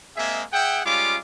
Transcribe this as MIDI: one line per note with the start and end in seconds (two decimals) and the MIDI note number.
0.17 0.43 56
0.17 0.43 58
0.17 0.43 60
0.17 0.43 68
0.17 0.43 76
0.52 0.79 68
0.52 0.79 76
0.52 0.79 78
0.52 0.79 79
0.85 1.17 55
0.85 1.17 56
0.85 1.17 61
0.85 1.17 65
0.85 1.17 77
0.85 1.17 86